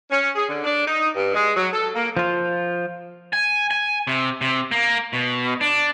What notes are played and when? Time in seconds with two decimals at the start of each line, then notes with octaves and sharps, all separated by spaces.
0.10 C#4
0.35 G#4
0.48 D3
0.64 D4
0.86 D#4
1.14 G2
1.34 G#3
1.57 F#3
1.72 A4
1.95 A#3
2.17 F3 F4
3.33 G#5
3.71 G#5
4.07 C3
4.41 C3
4.72 A#3
5.13 B2
5.61 D4